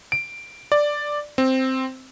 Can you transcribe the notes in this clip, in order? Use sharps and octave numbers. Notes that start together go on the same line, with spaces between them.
D7
D5
C4